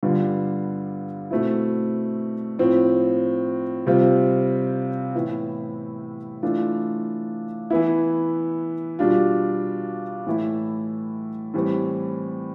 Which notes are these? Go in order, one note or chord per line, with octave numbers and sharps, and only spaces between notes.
G2 D3 G3 B3 F4
B2 A3 C4 E4
A2 F3 C4
C3 G3 C4 F4
A2 E3 B3 E4
E3 A3 D4 F4
E3 B3 E4
B2 G3 D4 F4
A2 E3 A3 E4
A2 E3 G3 C4